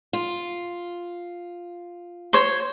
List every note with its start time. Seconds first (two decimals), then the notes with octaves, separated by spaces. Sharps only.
0.13 F4
2.33 C5 C#5